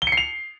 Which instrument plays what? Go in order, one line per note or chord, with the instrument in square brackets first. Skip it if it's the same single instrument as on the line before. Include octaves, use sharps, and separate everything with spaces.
[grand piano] G7
C#7
C7
F7